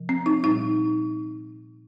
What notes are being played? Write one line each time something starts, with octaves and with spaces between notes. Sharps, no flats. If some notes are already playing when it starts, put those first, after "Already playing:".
Already playing: C3 F3
C4
D#4
A#2 G3 D#4